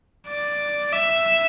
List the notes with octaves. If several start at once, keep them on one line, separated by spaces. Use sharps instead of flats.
D5
E5